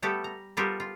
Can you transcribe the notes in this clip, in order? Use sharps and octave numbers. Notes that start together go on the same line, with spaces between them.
G3 A3 B3 G4 A4
A#5
G3 B3 F4 G4 A4 A#4
F4